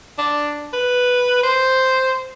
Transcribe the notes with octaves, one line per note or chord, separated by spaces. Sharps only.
D4
B4
C5